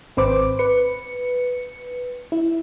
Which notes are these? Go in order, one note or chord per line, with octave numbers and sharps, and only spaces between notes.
G#1 C4 B4 C5 D6
B4 C#7
E4